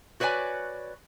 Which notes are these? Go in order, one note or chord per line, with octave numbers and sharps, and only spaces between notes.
F#4 B4 C#5 D5 G#5